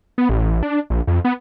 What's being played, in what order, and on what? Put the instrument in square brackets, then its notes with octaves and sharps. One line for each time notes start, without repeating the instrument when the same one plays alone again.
[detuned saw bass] B3
A1
D4
A#1
F2
B3